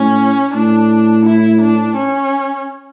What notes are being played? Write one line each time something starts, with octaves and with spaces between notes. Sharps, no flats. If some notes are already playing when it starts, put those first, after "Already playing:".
Already playing: A2 C#4
A2 D4
E4
D4
C#4